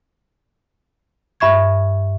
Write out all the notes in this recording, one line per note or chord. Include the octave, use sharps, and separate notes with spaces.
G2 E5 C#6 G#6